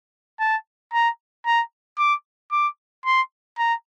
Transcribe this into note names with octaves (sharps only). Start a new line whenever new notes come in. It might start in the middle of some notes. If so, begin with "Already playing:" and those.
A5
A#5
A#5
D6
D6
C6
A#5